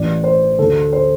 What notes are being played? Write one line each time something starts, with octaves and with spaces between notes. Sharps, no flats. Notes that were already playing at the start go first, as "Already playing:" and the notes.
Already playing: A1 A2 E3 D5
C5
D2 D3 A4
C5